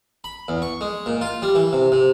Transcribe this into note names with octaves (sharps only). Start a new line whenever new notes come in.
B5
E2
C#6
G#3
A#2
F4
G3
E3
C3
C3